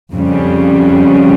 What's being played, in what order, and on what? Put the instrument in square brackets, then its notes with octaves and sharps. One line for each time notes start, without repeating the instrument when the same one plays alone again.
[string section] F2 C#3 G3